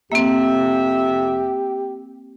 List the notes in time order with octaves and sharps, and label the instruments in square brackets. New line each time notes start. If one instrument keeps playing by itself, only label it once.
[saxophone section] F2 C3 E5 [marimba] A#3 C4 [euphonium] G4